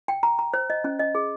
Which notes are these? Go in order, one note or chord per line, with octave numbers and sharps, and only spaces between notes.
G5
A#5
A#5
C5
D#5
C#4
D#5
G#4